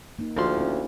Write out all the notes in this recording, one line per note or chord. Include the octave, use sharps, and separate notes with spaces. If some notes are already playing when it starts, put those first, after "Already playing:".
A#3 D#4
D2 F3 G4 F5 C6
C#4 E4